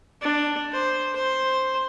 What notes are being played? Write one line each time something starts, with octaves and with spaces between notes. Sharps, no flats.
D4
C5
C5